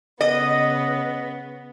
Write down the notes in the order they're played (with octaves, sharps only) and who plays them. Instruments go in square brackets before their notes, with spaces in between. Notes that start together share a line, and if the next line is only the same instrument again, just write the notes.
[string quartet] C#3 B3 [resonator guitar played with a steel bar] D#5